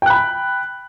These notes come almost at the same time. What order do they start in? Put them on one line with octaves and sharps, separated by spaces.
G5 F#6 B5